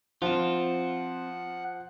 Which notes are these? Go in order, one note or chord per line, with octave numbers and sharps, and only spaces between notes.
F3 C4 F4 F#5